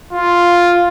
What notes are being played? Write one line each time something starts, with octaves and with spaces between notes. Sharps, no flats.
F4